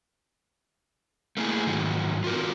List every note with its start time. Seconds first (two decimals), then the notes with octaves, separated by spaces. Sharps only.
1.37 A3 A#3 E4 G#4
1.67 F2 G#2 D#3 F#3
2.24 F4 F#4 A#4